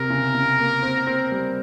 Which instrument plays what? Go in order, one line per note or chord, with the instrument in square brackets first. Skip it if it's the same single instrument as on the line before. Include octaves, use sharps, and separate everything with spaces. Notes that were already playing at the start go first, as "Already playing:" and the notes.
Already playing: [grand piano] C3 [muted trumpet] A#4
[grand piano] C#3
C#3
A#3
C4
C4
G3